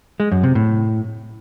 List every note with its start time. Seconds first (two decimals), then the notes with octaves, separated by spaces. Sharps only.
0.20 G#3
0.32 F#2
0.43 C3
0.55 A2